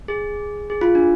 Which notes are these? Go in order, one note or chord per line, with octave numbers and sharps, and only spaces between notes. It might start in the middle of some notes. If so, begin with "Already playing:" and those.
G#4
G#4
F4
D4